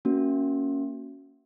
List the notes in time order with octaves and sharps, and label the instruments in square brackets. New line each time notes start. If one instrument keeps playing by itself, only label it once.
[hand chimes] A#3 C#4 F#4